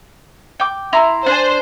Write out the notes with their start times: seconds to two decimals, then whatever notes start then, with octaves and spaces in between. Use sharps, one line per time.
0.60 G5 D6
0.93 E4 A#5 C6
1.26 D4 C5 G#5